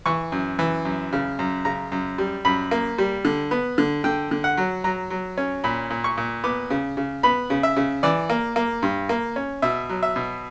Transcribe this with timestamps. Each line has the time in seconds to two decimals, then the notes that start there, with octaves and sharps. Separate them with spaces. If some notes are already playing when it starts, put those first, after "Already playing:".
0.06 E3 C#6
0.32 F#2
0.59 E3
0.85 F#2
1.13 C#3
1.39 F#2
1.65 C#3 A#5
1.92 F#2
2.18 G3
2.45 F#2 B5
2.71 A#3
2.98 G3
3.25 D3
3.51 B3
3.78 D3
4.04 D3 G5
4.31 D3
4.44 F#5
4.57 F#3
4.84 F#3 A#5
5.10 F#3
5.37 C#4
5.64 A#2 B5
5.90 A#2
6.04 C#6
6.17 A#2
6.44 B3 D6
6.70 C#3
6.97 C#3
7.23 B3 B5
7.50 C#3
7.63 E5
7.76 C#3
8.03 E3 D5
8.30 A#3
8.56 A#3
8.83 G2
9.09 A#3
9.36 C#4
9.62 B2 E5
9.89 F#3
10.03 E5
10.16 B2